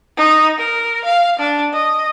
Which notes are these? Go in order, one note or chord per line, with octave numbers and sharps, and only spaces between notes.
D#4
A#4
F5
D4
D#5